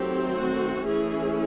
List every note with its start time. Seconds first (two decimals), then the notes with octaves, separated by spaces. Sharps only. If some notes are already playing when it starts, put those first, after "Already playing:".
Already playing: D#3 F#3 A3 C4 G4
0.32 F#4
0.85 E3 A3 C#4 E4 G#4